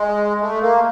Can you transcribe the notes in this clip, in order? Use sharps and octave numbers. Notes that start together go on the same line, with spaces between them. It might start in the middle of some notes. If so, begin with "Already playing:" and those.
Already playing: G#3
A3
A#3